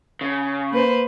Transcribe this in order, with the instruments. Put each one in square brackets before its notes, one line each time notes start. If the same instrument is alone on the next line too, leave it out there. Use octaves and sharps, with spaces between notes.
[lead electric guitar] C#3
[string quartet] A#3 B4 C5